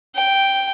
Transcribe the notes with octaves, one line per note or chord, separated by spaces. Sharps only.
G5